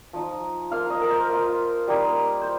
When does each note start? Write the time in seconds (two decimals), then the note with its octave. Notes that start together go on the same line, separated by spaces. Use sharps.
0.13 F3 D#4
0.71 A#3 F4 F5
0.90 D#5
1.01 A#4
1.10 C5
1.29 A#3 F4
1.87 G3 A#3 D#4
2.41 C5